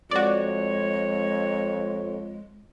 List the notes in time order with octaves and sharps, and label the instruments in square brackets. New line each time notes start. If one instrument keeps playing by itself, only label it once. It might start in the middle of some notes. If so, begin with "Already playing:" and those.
[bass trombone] F2 [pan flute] G#3 [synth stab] F#4 D5 [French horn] C#5